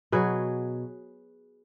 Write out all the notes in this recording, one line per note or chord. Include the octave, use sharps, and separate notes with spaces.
B2 F#3 G#4 B4